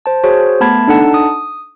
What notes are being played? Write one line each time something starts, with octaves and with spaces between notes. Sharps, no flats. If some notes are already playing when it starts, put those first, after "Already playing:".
C5 A5
F#4 G#4 C5 C#5
A3 B3 A5 B5 G#6
D4 D#4 A4 F#5 A5
D#6